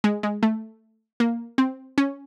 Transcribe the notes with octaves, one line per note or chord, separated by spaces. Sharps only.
G#3
G#3
A3
A#3
C4
C#4